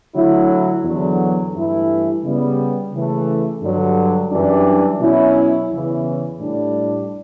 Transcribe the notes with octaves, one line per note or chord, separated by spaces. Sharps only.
D3 F#3 A3 E4
E2 D3 F#3
G2 E3 A3 E4
C#3 G3 B3
C#3 E3 A3
G2 D3 F#3
F#2 E3 G3 D4
B2 F#3 C#4 E4
E2 C#3 E3
A2 G3 D4